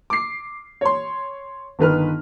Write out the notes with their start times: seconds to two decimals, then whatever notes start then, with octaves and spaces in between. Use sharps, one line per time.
0.10 D6 C7
0.81 C#5 C6
1.79 G1 D#3 B4 F6